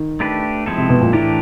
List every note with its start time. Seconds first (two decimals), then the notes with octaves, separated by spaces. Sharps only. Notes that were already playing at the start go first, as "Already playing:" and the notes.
Already playing: D#3
0.20 A3 D4 G4 B4
0.66 F3 G#3 C4 E4 A4
0.78 C3
0.90 B2
1.02 A#2
1.13 A2 E3 A3 D4 G4 A#4